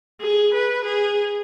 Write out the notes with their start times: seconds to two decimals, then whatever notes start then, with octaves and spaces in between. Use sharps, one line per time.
0.21 G#4
0.53 B4
0.85 G#4